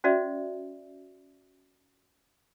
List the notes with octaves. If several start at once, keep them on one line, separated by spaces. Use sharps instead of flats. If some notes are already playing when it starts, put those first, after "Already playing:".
C#4 F#4 C5 D5 E5